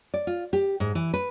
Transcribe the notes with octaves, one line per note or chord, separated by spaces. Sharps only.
D5
F4
G4
G#2
E3
B4